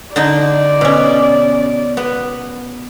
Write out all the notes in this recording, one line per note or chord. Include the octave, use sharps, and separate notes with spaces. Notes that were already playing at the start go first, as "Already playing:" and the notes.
D3 D#4 D5
B2 C#4
B3